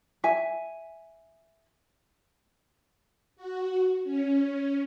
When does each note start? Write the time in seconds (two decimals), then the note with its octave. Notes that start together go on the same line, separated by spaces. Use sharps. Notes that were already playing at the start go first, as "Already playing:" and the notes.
0.24 E5 G#5
3.36 F#4
4.04 C#4